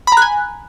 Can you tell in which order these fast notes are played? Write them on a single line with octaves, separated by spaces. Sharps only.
B5 A#5 F#6 G#5